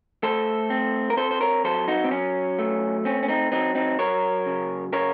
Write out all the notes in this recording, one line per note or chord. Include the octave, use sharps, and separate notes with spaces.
A3 A4 C5
C4
A#4
C4 A4 C5
C5
A#4 C#5
F#3 A4 C5
D#4 F#4
C4
F#3 C#4
A3
C4 C#4
C#4
C4 D#4
F#3 C4 D#4
C4 D#4
F#3 A#4 C#5
C#3
C#3 A#4 C#5